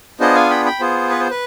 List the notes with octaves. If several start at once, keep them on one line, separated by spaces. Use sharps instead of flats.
B3 D4 F4 G#4 C5 D#5
F5 G#5
G5 B5
G5 B5
B3 F4 G#4 C5
B4
C5
B4